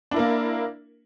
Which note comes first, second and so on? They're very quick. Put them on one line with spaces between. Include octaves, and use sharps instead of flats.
D4 E4 A#4 A#3